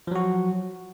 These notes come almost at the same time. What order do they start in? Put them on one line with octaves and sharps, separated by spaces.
F3 F#3 F#4